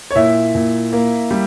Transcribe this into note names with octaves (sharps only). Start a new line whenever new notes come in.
C#5
A#2 E4 E5
A#2
A#3
G3